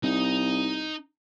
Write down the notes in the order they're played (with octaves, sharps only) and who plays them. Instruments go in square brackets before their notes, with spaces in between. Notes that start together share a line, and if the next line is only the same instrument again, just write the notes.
[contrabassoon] C2 [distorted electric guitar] D#4